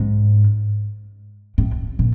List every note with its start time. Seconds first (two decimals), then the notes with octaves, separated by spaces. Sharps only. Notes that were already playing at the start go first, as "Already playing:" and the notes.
Already playing: G#2
1.58 A2
1.99 A#2